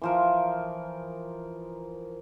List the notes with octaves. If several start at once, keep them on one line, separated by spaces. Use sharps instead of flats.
E3 F3 A#4